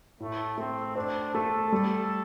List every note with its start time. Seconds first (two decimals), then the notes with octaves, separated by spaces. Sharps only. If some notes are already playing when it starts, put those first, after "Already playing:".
0.20 A2 A3
0.58 A3 C4
0.96 D4 C5
1.34 A3 A4
1.72 G3 A4